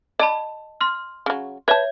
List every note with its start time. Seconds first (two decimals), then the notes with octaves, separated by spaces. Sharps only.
0.19 D5 D#5 A5 B5
0.81 C6 F6
1.26 C#3 F#3
1.68 B4 C#5 E5 A5 G#6